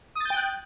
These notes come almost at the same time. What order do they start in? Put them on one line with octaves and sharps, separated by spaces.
D#6 A6 G6 G5 F#6